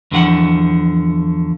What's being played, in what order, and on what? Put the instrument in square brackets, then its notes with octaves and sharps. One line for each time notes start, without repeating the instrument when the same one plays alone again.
[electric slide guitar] E2 D3 F3 F#4 F#5